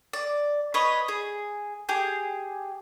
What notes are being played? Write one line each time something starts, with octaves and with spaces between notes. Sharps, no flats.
D5
B4 C#5 D#5
G#4
G4 G#4